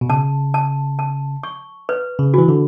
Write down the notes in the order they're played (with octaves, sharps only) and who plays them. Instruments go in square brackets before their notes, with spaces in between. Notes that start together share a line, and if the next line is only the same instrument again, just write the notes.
[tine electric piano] B2
[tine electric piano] C#3 [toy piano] A5
[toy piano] A5
A5
C#6
B4
[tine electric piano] C#3
[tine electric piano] E3 [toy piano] F#4
[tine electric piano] D3